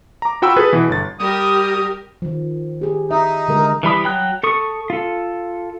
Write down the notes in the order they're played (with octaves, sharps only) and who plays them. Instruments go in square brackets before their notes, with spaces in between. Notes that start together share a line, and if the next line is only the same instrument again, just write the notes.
[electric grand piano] A#5 D6
F4 F#4 G5 B5 E6
G#4 A4 B4
B2 E3
G1 A6
[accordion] G3 D#6 [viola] G4 A#4
[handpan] D#3 F3
G4 G#4
[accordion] D#4 [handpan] E5
[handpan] D3 G#3 A#4
[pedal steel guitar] E3 G3 B5 D#6
F#3 G5 F#6
A4 C#6 D#6
F4 A4